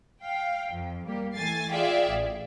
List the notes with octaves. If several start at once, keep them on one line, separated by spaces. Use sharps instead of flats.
F5 G5
F2
G3 A#3 G4
E3 A3 G#5 A6 C7
F4 G#4 D5 E5 F5 G5
A1